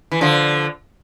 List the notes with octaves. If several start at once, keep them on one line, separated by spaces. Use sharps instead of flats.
E3
D3 F3